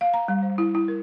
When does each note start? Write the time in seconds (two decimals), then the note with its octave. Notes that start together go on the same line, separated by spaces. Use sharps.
0.01 F5
0.14 A#5
0.28 G3
0.43 C5
0.58 E4
0.75 E4
0.88 A#4